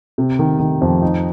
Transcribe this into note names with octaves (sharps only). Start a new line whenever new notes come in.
C3
D#3
D#3
F2
D#4